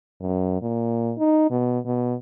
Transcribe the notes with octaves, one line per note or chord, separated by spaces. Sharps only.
F#2
A#2
D#4
B2
B2